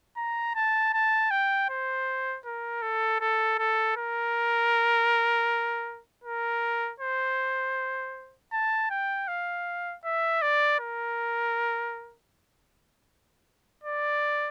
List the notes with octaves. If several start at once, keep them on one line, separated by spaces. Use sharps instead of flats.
A#5
A5
A5
G5
C5
A#4
A4
A4
A4
A#4
A#4
C5
A5
G5
F5
E5
D5
A#4
D5